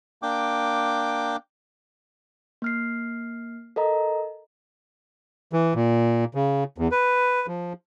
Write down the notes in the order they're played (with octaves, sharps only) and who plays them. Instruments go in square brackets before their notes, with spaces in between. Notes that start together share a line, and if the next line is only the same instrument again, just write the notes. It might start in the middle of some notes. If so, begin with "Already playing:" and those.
[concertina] A#3 D4 G5 D6
[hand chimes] A#3 F6 C7
A4 A#4 D#5 A#5
[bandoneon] E3
A#2
C#3
E2
B4
F3